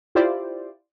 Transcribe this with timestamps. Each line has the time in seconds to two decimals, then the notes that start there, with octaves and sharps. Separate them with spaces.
0.15 E4 F4 G4 C5 D5